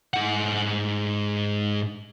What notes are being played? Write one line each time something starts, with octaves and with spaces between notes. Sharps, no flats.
G#2 F#5